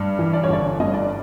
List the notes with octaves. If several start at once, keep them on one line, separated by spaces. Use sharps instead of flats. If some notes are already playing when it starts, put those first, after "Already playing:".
Already playing: G2
E3
D5
C#5
G1 D5
G2 D#5
D5